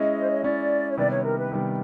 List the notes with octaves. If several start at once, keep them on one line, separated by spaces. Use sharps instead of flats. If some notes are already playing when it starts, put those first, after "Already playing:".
Already playing: G#3 C#4 E4 D#5
C5
C#5
G#3 C#4 E4 D5
C#5
C3 D#3 G3 B3 D5
C#5
A#4
B4
C3 D#3 G3 B3